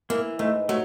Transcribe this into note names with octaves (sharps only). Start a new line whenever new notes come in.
E3 A#3
G#2 A3
F#3 A3